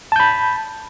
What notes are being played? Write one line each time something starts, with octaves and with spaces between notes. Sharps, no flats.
A5 B5 G6